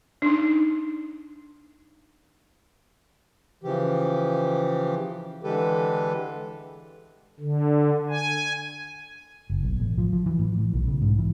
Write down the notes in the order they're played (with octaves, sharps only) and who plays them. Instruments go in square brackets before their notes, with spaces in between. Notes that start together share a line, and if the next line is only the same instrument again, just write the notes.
[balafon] D4 D#4
[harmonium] C#3 E3 F3 G4
D3 E3 G#3 G4 A4 B4
[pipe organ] D3
G#5
[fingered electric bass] F#1
B1
A1
F3
F3
E3
A2
E3
B1
C#3
G#2
E3